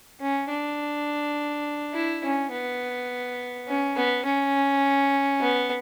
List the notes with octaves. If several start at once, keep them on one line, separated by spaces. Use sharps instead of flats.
C#4
D4
E4
C#4
B3
C#4
B3
C#4
B3